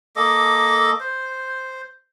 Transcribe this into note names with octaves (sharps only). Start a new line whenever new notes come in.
A#3 A4 D#5 D6
C5